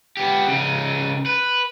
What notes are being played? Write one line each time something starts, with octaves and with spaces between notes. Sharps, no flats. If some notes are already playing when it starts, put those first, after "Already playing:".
B3 G4
C#3 D#4
B4